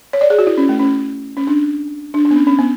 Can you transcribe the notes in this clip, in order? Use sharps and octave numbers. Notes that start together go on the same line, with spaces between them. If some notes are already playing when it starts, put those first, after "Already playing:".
C#5
D5
G#4
F#4
E4
C#4
A3
C#4
C#4
D4
D4
D4
B3
C#4
C#4
B3